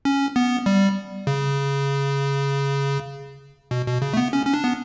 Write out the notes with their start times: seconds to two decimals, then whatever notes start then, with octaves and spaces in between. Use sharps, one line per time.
0.05 C#4
0.36 B3
0.66 G3
1.27 C#3
3.71 B2
3.87 B2
4.02 C#3
4.14 A3
4.17 B3
4.33 C#4
4.46 C#4
4.54 D4
4.64 B3